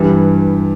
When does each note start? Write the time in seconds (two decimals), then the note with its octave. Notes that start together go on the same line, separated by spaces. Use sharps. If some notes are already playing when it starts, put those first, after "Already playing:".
Already playing: G2 E3 G3